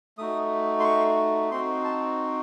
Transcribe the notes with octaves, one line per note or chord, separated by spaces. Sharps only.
A3 D#4 F#4 D#6
C6
C#6
C4 D#4 F#4 C6
A5